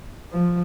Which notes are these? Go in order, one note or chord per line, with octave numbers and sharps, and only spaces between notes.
F3